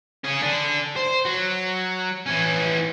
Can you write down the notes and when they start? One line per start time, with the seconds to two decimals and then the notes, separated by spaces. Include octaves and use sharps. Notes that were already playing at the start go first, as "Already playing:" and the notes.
0.24 C#4 G#4
0.42 D3 D4
0.96 C5
1.25 F#3
2.26 E3 C#4